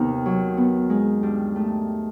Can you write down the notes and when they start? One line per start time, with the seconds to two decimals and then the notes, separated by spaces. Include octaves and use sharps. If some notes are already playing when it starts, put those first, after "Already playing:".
Already playing: D#2 C3 D#3 B3
0.26 F#3
0.57 B3
0.90 G#3
1.23 G2
1.56 A3